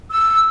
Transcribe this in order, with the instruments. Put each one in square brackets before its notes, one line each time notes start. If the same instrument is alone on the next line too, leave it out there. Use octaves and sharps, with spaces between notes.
[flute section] E6